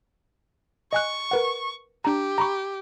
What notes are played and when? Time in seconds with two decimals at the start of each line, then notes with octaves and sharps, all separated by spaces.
0.93 D#5 G#5 C#6 F#6
1.31 A#4 B4 F#5
2.05 D4 G4 A#5
2.38 A#5 B5 C#6